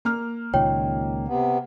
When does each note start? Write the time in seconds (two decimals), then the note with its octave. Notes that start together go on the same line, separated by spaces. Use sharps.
0.05 A#3 F6
0.54 C#2 A#2 D#3 C#5 G5
1.28 C3 B3